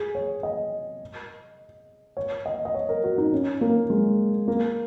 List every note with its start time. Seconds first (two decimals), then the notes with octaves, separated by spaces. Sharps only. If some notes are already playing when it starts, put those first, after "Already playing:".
Already playing: G#4
0.15 C#5
0.43 D#5
2.17 C#5
2.46 D#5
2.65 D#5
2.74 C#5
2.89 A#4
3.03 F#4
3.18 D#4
3.33 C#4
3.61 A#3
3.90 G#3
4.48 A#3